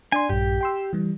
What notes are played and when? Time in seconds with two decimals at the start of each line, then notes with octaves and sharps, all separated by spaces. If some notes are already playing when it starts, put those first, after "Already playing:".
0.12 D4 D5 G#5 C6
0.29 A#1 G2 G4
0.61 G5 C6 E6
0.93 E3 G3